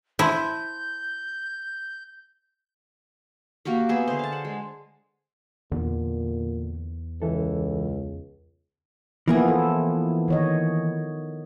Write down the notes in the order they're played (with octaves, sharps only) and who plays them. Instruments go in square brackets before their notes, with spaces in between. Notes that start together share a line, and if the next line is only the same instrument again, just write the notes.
[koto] E4 [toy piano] C5 A5 C6 [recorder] G6
[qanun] A#3 F#4 G4 A#4
B3 G#4 E5
D3 C5
F5 A5
F#5
G#3
[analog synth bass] E2 [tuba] A#2 [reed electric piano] D3
[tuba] C#2 [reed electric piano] E3 A4
[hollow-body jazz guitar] E3 A#3 G#4 [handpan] F3 B3 E4
[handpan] A4
D#3 C#5 D#5